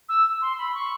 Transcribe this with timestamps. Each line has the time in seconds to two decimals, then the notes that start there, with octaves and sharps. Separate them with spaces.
0.09 E6
0.42 C6
0.58 B5
0.75 C#6